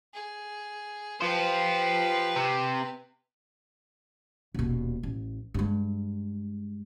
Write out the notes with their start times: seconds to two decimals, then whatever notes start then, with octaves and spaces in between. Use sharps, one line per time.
0.14 G#4
1.21 F4 G4 B4 C5
2.36 C3
4.55 D#1 B2
5.03 A1
5.54 G2 G#3